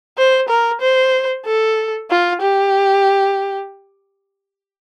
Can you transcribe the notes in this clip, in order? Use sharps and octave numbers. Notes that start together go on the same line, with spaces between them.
C5
A#4
C5
A4
F4
G4